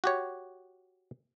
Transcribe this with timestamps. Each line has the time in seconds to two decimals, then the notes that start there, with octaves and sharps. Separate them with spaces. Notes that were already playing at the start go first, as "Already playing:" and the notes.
0.04 F#4 G4 C#5